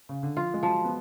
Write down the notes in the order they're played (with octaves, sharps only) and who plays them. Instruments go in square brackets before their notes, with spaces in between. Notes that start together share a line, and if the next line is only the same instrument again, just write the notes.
[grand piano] C#3
D3
[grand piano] F3 [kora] F4
[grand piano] G#3
[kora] F3 [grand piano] F#3
[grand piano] B3